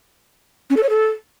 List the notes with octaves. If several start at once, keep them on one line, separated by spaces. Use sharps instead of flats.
C#4
A4
C#5
A4